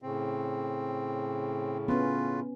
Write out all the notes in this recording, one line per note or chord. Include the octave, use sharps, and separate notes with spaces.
A2 C#3 C4
B3 C#4 F4 B4